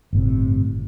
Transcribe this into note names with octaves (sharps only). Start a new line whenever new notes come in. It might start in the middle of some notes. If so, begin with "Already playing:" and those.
G1 A2 C3